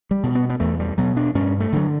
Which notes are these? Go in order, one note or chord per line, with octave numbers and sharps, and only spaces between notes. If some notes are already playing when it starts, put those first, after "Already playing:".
G3
B2
B3
B3
E2 A3
G3
B2 F#3
D4
G2 C#4
A3
D3 F#3